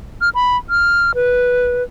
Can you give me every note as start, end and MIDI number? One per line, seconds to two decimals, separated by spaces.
0.21 0.29 89
0.35 0.57 83
0.70 1.12 89
1.15 1.83 71